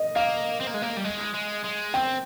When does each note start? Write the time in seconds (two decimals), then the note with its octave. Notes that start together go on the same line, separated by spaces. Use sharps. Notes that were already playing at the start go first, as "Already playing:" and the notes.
Already playing: D#5
0.16 A#3 F5
0.61 C4
0.67 A#3
0.74 G#3
0.82 A#3
0.97 G3
1.04 G#3
1.34 G#3
1.64 G#3
1.94 C4 G5